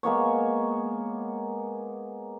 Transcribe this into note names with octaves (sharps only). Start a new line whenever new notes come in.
G#3 A#3 B3 C#5